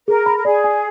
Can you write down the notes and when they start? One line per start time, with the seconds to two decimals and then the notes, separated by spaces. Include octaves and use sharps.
0.07 G#4 A#4
0.26 B5
0.37 A#4
0.45 G#4 D5
0.64 G#5